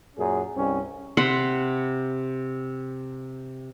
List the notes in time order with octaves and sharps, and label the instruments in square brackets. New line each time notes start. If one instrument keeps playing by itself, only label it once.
[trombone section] F#2 A#2 C#4 G#4
C2 G2 C4 C#4
[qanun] C3 F#5 B5 C6